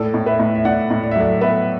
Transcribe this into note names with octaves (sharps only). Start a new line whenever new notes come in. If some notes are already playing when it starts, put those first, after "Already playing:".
Already playing: A2 A4 D5
A2
B4 E5
A2
E5
A2 D5 F#5
A2
D5
E5
F#3 A4 D5
B3 B4 E5